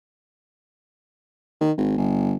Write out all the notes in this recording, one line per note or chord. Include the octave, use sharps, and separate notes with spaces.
D#3
G#1
G1